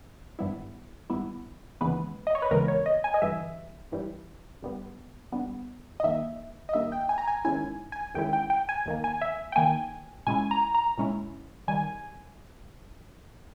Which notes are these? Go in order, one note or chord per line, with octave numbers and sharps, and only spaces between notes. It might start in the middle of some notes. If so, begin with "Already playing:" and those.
G#1 G2 G3 B3 E4
G#1 G2 G3 B3 E4
D#2 C#3 E3 G#3 B3 B4
D#5
C#5
B4
D#2 C#3 E3 G#3 B3 A#4
C#5
D#5
G#5
D#5
G1 G2 E3 G3 E5
G1 G2 E3 G3
G1 G2 G3 B3
G1 G2 G3 B3
D#5
G2 D#3 A#3 E5
D#5
G2 D#3 A#3 E5
G5
G#5
A#5
G#5
E2 D#3 G#3 C#4 E4 G#5
G#5
E2 D#3 G#3 C#4 E4 G5
G5
G5
G#5
D#2 D#3 A#3
G#5
E5
G5
D#2 D#3 A#3 G#5
A#2 G#3 C#4 E4 G#5
A#5
A#5
A#2 G#3 C#4 E4
D#3 G3 G#5